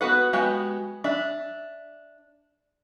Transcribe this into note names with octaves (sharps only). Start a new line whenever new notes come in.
B3 F#4 B4 F#5
G#3 B3 F#4 G4 G5
D4 E5